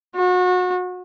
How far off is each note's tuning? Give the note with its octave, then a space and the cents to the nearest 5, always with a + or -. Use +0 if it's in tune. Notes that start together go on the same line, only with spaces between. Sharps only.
F#4 -30